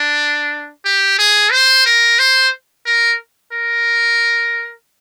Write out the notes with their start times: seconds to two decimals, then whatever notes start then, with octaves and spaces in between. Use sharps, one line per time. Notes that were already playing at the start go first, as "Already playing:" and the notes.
Already playing: D4
0.85 G4
1.19 G#4
1.52 C5
1.86 A#4
2.19 C5
2.86 A#4
3.53 A#4